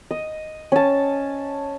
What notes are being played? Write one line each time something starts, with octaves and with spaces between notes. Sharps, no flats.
D#5
C#4 A5